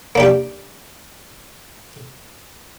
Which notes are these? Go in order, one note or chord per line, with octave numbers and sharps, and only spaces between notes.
A#3 D4 G4